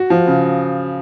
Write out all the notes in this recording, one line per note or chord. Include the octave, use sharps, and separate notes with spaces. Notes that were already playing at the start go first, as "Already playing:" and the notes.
Already playing: F#4
F3
C#3